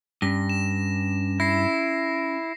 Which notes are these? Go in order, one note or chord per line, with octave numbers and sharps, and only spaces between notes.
G2 C#4 A#6
E7
E4 A#6 C7